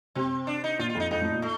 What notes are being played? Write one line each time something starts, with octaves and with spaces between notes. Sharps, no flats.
C3 C4
D4
D#4
A#2 F4
F4
F2 D#4
F2 D#4
A2
A#2
A3